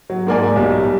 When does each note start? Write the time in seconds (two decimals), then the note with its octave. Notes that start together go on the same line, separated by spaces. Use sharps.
0.10 F#3
0.27 G#2 A#3 D5 G#5
0.56 B1 G3